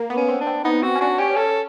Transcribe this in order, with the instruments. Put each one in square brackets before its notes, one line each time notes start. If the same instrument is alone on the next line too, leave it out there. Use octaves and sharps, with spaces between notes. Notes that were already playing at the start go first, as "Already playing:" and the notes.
Already playing: [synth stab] A#3
B3
[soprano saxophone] C#4
[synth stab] C4
[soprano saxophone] D4
[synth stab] C4
[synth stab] B3 [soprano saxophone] D#4
[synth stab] C4 [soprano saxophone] F#4
[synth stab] C#4
[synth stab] D4 [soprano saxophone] F#4
[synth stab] C#4 [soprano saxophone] G4
[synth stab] C#4 [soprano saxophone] A4